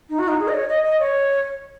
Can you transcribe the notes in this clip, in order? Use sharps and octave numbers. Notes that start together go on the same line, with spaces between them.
D#4
F#4
D#4
G#4
D#5
C#5
D#5
D#5
C#5